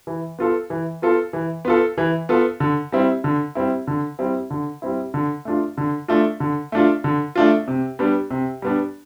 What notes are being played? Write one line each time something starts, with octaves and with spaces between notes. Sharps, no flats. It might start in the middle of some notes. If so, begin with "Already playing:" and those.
E3
B3 F4 A4
E3
B3 F4 A4
E3
B3 F4 A4
E3
B3 F4 A4
D3
G3 C4 E4
D3
G3 C4 E4
D3
G3 C4 E4
D3
G3 C4 E4
D3
A3 D4 F4
D3
A3 D4 F4
D3
A3 D4 F4
D3
A3 D4 F4
C3
G3 B3 D4
C3
G3 B3 D4